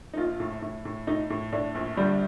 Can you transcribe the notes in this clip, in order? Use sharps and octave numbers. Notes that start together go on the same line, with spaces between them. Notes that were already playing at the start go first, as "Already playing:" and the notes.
D#4
A#1 F4
A2
A2
A2
A2 D#4
A2
A2 D4
A#1
D3 G3